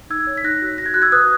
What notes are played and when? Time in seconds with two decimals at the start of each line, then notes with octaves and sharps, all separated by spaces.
0.10 D#4 E6 G#6
0.27 C#5
0.37 B6
0.44 D#4 F#6 A#6
0.62 F#4
0.78 F#4 A#6
0.86 G#6
0.94 F#4 F#6
1.02 E6 G#6
1.12 B4 D#6 F#6